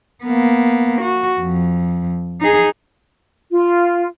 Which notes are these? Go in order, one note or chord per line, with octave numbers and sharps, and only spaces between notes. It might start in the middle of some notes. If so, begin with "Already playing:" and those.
A#3 B3
F#4
F2
D#4 G#4
F4